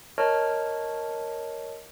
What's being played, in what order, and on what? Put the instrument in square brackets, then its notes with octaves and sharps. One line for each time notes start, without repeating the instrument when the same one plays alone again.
[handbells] A#4 C#5 D#5 A5 C#6 F6